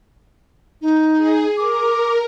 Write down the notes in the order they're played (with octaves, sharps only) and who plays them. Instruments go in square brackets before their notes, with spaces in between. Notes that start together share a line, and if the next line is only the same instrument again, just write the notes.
[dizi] D#4
[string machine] G#4
[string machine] A#4 [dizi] D6